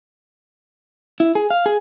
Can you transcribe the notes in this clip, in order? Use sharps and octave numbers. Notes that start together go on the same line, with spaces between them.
E4
G#4
F5
G#4